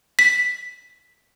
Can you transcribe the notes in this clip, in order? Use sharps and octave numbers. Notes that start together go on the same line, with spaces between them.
B6